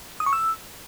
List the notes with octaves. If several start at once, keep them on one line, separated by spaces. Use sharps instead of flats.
D#6
C#6
E6